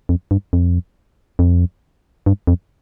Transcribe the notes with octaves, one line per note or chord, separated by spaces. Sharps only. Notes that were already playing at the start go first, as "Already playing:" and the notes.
F2
G2
F2
F2
G2
F2